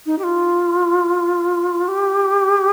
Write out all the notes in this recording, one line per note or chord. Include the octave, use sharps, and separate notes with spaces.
D#4
G4
F4
G4